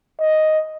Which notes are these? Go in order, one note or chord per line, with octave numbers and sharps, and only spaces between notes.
D#5